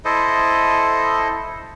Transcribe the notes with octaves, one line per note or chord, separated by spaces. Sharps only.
E4 A4 C5 D#5